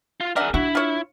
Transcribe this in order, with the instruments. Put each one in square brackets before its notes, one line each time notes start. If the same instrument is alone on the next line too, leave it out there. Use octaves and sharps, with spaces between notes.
[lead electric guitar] F4
[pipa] D4 E5 F#5 [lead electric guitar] G#4 A#4
[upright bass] D4 [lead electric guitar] E4 [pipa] F#4
[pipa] F4 C#5